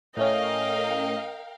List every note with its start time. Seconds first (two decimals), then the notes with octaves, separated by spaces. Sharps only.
0.17 A2 A3 C#4 A#4 D#5 F5 G5